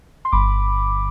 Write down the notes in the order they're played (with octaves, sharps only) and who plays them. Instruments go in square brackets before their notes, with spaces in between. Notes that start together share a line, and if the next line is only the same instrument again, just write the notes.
[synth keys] C6
G1 B5 D6